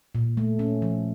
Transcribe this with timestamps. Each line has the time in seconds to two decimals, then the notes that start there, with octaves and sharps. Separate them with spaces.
0.15 A#2
0.37 A3
0.59 C#4
0.82 F3